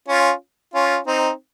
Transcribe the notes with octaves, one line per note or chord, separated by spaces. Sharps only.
C#4 F4
C#4 F4
C4 D#4